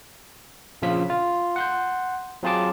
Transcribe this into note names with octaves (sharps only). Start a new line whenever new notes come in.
A#1 C#3 F3 F4 B6
F4
F#5 C6 G6
F#3 C4 F4 G#4 A5 D6